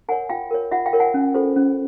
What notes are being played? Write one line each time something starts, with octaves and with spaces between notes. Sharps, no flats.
A#4 C#5 F#5 G#5
F4 F5 G5
A#4 C#5
F4 E5 F#5
F5 G5
A#4 C#5
F#5 G#5
C#4
F4 A4 C5
C#4